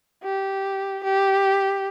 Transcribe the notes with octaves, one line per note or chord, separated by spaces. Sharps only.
G4
G4